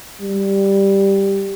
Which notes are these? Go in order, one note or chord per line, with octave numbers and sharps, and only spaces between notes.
G3